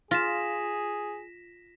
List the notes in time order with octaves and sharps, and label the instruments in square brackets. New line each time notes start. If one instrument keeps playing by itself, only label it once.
[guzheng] F4 [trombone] G#4 [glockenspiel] A#6 B6 E7